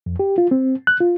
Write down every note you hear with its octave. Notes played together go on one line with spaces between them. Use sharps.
F2
G4
F4
C4
F#6
F4